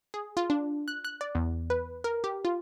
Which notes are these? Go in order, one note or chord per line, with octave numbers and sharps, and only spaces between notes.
G#4
F4
D4
F#6
F#6
D5
E2
B4
A#4
G4
F4